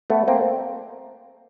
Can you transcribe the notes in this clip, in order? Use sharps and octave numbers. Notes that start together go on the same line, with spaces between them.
A3 B3
A#3 C4